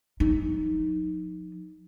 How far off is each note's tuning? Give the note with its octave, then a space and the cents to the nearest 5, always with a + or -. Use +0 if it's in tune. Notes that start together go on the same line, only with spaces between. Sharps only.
F3 +40 D#4 +0